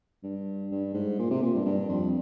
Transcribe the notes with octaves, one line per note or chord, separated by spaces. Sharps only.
G2
G2
G#2
A#2
C3
A#2
G2
G2
F2